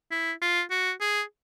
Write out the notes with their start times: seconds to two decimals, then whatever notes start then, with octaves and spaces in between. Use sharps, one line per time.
0.11 E4
0.41 F4
0.71 F#4
1.00 G#4